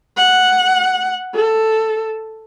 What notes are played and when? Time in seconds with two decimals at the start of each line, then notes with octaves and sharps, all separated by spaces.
0.17 F#5
1.34 A4